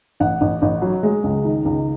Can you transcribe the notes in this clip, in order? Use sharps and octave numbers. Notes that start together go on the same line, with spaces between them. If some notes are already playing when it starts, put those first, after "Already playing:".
A1 F#5
A1
A1
F#3
G#3
C#2
D#3
C#2